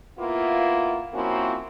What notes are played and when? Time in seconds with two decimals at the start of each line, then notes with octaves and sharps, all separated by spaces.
0.18 A#3 B3 E4 F4
1.14 F3 A#3 C4 C#4 E4 F#4